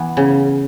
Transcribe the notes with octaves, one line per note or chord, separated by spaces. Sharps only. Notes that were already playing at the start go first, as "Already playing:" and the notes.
Already playing: E3 B3
C#3